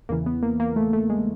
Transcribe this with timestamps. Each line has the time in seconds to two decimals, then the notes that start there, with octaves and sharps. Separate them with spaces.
0.09 E2 C#3 E3 A#3
0.26 B3
0.43 A#3
0.60 A#3
0.76 A3
0.93 A3
1.10 G#3